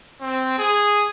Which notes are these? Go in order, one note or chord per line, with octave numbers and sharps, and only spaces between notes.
C4
G#4